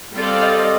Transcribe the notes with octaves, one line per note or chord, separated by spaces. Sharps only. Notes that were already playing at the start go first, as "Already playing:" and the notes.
G3 C4 F4 A4 D5
D#5